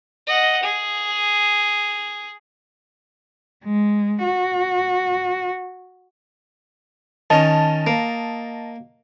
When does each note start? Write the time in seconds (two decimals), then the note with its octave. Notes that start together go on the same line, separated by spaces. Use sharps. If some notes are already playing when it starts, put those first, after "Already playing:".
0.27 D#5 F#5
0.63 G#4
3.65 G#3
4.24 F#4
7.30 D#3 C#4 D#5 A5
7.87 A#3